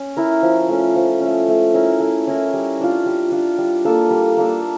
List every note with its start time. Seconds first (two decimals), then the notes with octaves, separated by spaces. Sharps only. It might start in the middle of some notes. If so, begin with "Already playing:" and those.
Already playing: C#4
0.17 E4 A#4
0.42 F3
0.69 A3 C#4
0.96 F3
1.21 A3 C#4
1.48 A3
1.74 C#4 E4 A#4
2.00 A3
2.27 C#4 E4 A#4
2.54 G3
2.80 D4 F4
3.06 G3
3.31 D4 F4
3.58 G3
3.84 A#3 D4 A4
4.10 G3
4.37 A#3 D4 A4